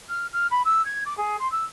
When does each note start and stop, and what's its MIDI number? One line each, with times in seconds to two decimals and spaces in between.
0.08 0.26 89
0.32 0.46 89
0.50 0.61 83
0.65 0.84 88
0.85 1.02 92
1.05 1.16 86
1.17 1.36 68
1.39 1.50 84
1.51 1.64 88